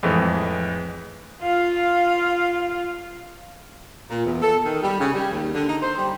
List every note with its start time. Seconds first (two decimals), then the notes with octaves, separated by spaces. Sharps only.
0.03 F2 A2 E3 G#3
1.42 F4 F5
4.10 A#2
4.26 E2
4.42 A4
4.65 D#3
4.83 G3
5.00 C#3
5.14 G3
5.32 D#2
5.55 D3
5.69 D#4
5.82 C5
5.98 G3